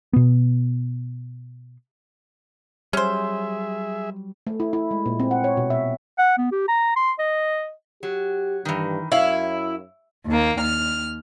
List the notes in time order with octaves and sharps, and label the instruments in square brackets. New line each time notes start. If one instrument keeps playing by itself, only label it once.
[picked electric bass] B2 B3
[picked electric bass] F#3 G3 [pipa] C#4 C5 [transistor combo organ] G#4 E5
[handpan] A3
E4
E4
G#3
A#2
C4
F#5
C#5
B2
E5
[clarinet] F#5
B3
G4
A#5
C6
D#5
[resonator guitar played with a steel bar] F#3 [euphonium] G4
[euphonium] G2 [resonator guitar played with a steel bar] D#3 E3
[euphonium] F#2 [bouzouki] E4 [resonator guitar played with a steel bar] C#5 F5
[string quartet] D#2 A#3
D#2 F6